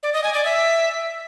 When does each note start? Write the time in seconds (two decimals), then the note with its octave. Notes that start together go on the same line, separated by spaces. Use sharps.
0.03 D5
0.13 D#5
0.24 G#5
0.34 D5
0.45 E5